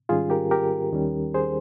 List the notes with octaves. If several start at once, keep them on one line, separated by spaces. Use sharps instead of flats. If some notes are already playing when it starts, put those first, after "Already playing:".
G#2 D#3 G3 C#4 F4 G#4
G4 A#4
G4 A#4
D#2 D#3 G3 C#4
G#4 C5